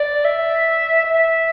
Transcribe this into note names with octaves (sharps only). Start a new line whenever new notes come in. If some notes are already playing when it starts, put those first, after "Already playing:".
Already playing: D5
E5
E5